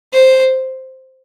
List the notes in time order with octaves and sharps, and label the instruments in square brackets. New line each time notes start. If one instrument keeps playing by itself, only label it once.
[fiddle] C5